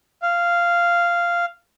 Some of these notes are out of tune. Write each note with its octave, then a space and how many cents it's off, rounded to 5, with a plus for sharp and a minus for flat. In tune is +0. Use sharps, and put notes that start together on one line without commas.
F5 -10